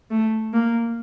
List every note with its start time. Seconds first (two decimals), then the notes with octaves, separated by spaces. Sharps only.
0.11 A3
0.54 A#3